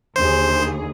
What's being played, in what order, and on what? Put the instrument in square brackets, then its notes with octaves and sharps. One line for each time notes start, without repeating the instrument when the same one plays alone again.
[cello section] D#2 D3 G#4 [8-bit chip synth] C5